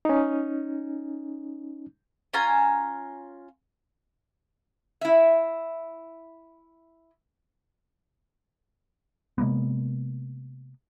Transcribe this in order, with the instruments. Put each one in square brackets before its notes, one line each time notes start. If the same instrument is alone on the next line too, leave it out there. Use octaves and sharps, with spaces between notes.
[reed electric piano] C#4 D#4
[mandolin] C#4 F4 G#5 A#5
[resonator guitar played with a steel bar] E4 E5
[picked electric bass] C3 G#3 A#3 B3